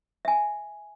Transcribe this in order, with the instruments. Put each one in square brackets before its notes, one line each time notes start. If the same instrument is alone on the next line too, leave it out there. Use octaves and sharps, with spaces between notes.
[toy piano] E5 G#5